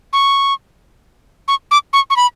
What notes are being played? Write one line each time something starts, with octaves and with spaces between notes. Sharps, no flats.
C#6
C#6
D6
C#6
C#6
B5